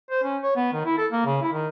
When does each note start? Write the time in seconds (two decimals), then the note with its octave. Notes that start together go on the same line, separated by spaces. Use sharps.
0.11 C5
0.24 C#4
0.42 C#5
0.56 B3
0.73 D#3
0.85 E4
0.98 A4
1.12 A#3
1.26 C#3
1.42 E4
1.53 D#3